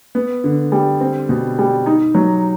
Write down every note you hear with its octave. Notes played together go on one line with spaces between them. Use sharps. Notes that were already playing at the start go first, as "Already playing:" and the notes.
B3
D3
G3
C4
B2
G3
D#4
F#3